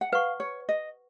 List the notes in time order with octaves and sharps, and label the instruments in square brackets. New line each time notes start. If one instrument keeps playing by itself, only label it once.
[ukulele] F#5
[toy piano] B4 F#5 C#6 [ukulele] F5
[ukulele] C#5
D#5